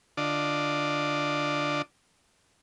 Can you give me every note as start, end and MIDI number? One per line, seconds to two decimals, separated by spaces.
0.17 1.82 50
0.17 1.82 62
0.17 1.82 65
0.17 1.82 74
0.17 1.82 75